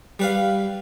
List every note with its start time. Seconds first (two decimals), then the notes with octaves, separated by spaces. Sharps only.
0.19 G3 B4 F5